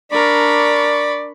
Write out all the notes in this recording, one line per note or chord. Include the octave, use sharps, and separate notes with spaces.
D4 A#4 D5 B5 C#6